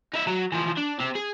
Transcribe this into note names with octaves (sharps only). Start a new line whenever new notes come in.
D#4 E5
F#3
E3 F3
D4
C4 G4
G#4